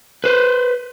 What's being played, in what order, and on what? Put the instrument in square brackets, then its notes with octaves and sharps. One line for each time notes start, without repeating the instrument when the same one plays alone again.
[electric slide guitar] B4 C5